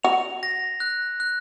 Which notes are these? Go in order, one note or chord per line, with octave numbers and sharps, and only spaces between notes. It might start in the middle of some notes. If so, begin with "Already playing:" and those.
F#4 F7
A#6
F#6
F#6